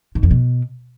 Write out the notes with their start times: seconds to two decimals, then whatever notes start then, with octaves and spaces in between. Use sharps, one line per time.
0.15 G#2
0.23 F2
0.31 B2